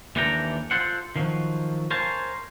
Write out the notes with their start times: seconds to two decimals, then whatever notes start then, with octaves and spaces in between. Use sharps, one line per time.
0.16 D#2 E3 D4 A4 G5 A#5
0.71 F4 A4 C5 F#5
1.16 D#3 F3 F#3
1.91 A#4 C5 C#5 F5 G#5 A5